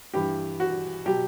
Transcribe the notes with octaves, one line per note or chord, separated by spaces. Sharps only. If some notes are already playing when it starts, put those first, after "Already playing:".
G2 E3 G4
F#4
B2 F#3 G4